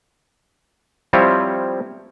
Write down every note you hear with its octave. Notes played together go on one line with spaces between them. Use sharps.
F3 G3 C4 E4 F4 C#5